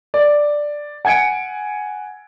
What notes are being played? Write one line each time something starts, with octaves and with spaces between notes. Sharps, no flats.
D5
F#5 G#5 G#6 C#7 D7